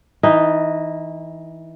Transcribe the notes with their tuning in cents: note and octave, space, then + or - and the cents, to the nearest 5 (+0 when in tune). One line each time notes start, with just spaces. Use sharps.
E3 -20 D#4 +0